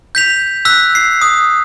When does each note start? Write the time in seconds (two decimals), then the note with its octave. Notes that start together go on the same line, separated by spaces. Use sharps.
0.15 G6 B6 F7
0.65 E6 F#6 B6
0.95 C7
1.22 D#6